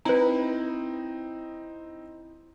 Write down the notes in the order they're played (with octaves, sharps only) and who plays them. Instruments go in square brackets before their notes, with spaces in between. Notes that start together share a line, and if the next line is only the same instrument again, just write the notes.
[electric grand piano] C4 D#4 [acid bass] E4 [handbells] B4 A#5